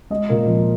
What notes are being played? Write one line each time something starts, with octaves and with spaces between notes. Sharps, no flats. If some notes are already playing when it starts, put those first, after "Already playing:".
G#3 D#5
A#2 A#4
F3